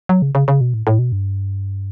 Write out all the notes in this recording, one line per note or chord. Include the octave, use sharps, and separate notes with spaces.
F#3
C#3
C#3
C#3
B2
A2
A2
B2
G2